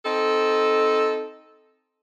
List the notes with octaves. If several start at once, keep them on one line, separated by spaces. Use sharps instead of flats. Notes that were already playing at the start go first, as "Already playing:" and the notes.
C4 D#4 A4